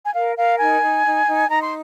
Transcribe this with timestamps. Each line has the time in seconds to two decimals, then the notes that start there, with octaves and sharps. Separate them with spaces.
0.04 G#5
0.13 A#4 F5
0.36 A#4 F5
0.59 D#4 G#5
0.82 D#4
1.05 D#4
1.27 D#4
1.49 D#4 A#5
1.62 C6